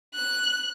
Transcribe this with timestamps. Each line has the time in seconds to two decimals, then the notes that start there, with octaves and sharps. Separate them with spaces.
0.14 F#6